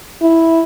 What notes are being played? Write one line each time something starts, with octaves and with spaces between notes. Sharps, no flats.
E4